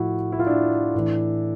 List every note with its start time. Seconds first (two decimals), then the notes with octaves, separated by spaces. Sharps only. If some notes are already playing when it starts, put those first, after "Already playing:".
Already playing: A2 F3 E4 F#4
0.32 E4
0.39 F4
0.47 D4 E4
0.94 A2 E3